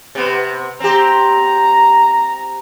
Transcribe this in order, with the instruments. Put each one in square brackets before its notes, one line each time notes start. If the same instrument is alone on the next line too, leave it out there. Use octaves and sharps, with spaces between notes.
[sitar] C3 B3
[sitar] C4 G4 [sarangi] A#5